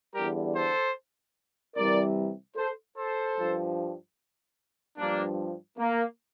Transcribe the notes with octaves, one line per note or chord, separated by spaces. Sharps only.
E2 D3 G3 G4 A#4
A4 C5
C2 C3 E3 G3 A#4 D5
A4 C5
A4 C5
G2 F3
G2 F3 A#3 D4
A#3